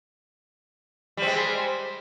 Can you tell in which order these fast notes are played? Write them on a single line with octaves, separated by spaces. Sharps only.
G3 C4 G#3